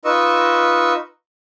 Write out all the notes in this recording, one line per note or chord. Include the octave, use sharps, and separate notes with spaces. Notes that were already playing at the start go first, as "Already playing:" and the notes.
D#4 F4 B4 D#5 C#6 E6